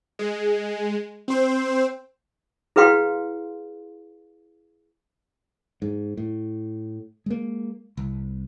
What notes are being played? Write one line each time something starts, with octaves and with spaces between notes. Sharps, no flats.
G#3
C4 C5
E4 G#4 B4 F5 G5 C6
G#2
A2
G#3 A#3
C2